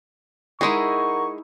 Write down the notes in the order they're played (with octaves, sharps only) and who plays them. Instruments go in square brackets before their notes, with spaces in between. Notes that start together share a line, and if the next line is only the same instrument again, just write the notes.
[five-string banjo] G#3 G#4 [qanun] D#4 E4 [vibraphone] A#4 F#5 A#5 [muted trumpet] C#6